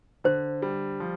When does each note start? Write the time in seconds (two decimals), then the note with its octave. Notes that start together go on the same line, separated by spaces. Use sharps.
0.24 D3 C5
0.62 G3
1.00 F3